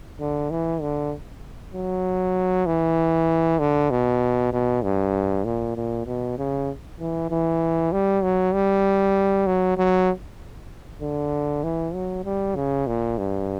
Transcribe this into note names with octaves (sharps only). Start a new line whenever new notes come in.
D3
E3
D3
F#3
E3
D3
B2
B2
G2
A#2
A#2
B2
C#3
E3
E3
G3
F#3
G3
F#3
F#3
D3
E3
F#3
G3
C#3
A#2
G2